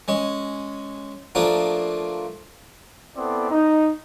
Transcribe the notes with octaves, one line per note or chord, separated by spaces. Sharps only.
G#3 C#4
F3 A3 A#3 D4 F4
B3 C4 E4 A4 D5
D#4